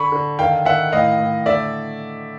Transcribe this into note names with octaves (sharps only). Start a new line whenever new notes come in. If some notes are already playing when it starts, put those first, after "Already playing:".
Already playing: D3 B5 C#6
D3
D#3 F5 G5
D#3 E5 F#5
A2 D#5 F5
A2
D3 D5 E5